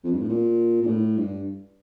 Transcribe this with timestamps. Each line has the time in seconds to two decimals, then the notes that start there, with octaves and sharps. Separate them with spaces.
0.04 F2
0.13 G2
0.20 A2
0.29 A#2
0.82 A#2
0.87 A2
1.17 G2